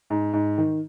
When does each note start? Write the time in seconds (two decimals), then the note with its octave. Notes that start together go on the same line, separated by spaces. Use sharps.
0.10 G#2
0.33 G#2
0.58 D#3